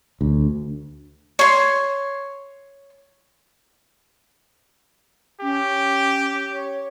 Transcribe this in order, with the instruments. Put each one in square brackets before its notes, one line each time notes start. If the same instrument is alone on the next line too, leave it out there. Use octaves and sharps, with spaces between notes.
[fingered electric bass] D2
[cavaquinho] C#5 C6
[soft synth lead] C#4 [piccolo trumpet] G4
[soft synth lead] C#5